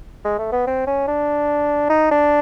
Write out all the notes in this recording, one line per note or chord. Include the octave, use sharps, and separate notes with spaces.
G#3
A3
B3
C4
C#4
D4
D#4
D4